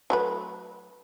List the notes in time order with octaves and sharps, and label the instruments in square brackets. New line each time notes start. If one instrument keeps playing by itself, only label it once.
[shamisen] F#3 A3 B4